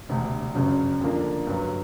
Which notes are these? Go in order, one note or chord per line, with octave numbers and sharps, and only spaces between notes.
E1 D2 C3
G1 F#2 C#3 F#3
F2 D3 F3 A#3 D4
G2 D3 F#3